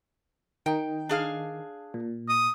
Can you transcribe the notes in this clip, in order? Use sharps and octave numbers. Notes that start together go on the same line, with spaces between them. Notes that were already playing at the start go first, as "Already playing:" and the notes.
D#3 D#4 G5
D4 G#4 F5
A#2
D#6